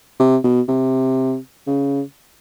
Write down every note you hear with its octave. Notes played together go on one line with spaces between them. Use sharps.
C3
B2
C3
C#3